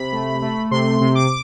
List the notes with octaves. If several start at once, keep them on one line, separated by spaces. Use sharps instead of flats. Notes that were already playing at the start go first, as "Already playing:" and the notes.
Already playing: C3 B5
A3
A3
C3 C6
C3
D6